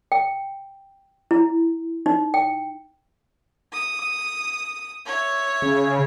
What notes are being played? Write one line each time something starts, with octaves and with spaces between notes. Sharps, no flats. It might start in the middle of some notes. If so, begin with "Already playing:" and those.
G5
E4
D#4
G5
D#6
C#5 E5
C#3